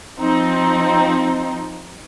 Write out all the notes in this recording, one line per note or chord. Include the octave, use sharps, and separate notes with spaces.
F3 C4 D#4